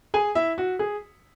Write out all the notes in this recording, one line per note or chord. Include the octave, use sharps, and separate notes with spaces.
G#4 G#5
E4 E5
F#4
G#4